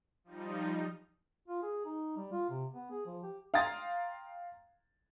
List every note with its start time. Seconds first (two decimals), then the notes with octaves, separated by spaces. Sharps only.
0.24 F3 G3 D#4
1.48 F4
1.62 G#4
1.85 D#4
2.16 G3
2.32 F4
2.50 C3
2.73 B3
2.91 G#4
3.06 F3
3.23 G4
3.54 F5 G5 A#5 C6 D#6 A6